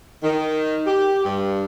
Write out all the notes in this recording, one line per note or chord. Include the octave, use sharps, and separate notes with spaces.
D#3
G4
G2